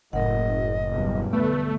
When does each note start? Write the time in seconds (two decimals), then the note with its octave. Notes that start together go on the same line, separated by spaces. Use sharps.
0.13 F#1 A2 A#4 D#5 F#5
0.90 B1 E2 G2
1.33 D3 A3 B3 B4